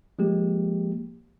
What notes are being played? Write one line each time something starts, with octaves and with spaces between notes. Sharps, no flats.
F3 G#3 A#3 G4